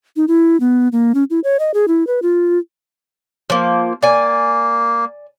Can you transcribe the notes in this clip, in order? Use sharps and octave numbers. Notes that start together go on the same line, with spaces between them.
D#4
E4
B3
A#3
C#4
E4
C#5
D#5
G#4
E4
B4
F4
F3 A#3
A#3 D5 G#5